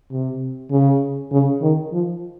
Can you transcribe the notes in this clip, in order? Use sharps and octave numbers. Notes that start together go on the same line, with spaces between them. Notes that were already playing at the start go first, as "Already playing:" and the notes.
C3
C#3
C#3
D#3
F3